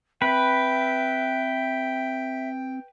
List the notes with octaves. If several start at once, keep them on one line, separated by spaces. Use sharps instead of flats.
C4 B4 E5 G5